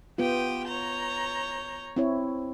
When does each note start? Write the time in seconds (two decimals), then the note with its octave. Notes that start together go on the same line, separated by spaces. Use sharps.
0.18 B3 F4 G4 G5 D#6
0.65 C#5 A#5 G6
1.96 C4 E4 C#5